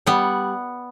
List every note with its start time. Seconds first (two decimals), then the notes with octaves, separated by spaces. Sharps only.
0.07 G3 B3